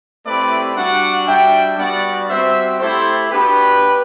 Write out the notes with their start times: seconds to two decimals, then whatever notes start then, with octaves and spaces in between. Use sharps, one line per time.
0.25 A3 C4 E4 G4 B4 D5
0.75 G3 D4 F#4 D5 F#5
1.26 G3 D4 F#4 E5 G5
1.77 G3 B3 D4 F#4 D5 F#5
2.28 G3 C4 F#4 C5 E5
2.79 A3 E4 G4 A4 C5
3.30 B3 D4 F#4 G4 B4